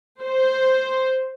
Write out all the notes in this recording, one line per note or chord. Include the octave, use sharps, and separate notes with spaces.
C5